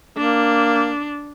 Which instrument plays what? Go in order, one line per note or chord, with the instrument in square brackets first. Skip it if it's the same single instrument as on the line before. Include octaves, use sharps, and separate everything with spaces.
[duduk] A#3 [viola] D4